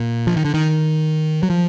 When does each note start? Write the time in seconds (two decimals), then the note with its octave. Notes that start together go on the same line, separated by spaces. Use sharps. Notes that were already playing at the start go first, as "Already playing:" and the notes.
Already playing: A#2
0.27 F3
0.36 D#3
0.45 D3
0.54 D#3
1.43 F#3
1.50 F3